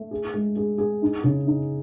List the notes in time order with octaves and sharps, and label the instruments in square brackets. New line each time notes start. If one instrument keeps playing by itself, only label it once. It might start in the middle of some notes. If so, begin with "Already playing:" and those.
Already playing: [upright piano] A3
G#4
G#3
G#4
G#4
D#4
C#3
D#4